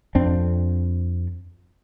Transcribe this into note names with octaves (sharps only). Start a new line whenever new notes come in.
F2 C4 D4